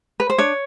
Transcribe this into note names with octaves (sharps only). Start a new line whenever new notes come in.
B4
C5
D4 C#5